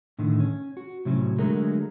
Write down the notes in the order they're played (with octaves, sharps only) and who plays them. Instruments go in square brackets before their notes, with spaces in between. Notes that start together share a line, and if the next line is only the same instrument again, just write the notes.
[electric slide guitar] A2 D3 D#3
C#4
F#4
A2 C3 F#3 C#4
D3 F#3 G#3 A3 F#4 A#4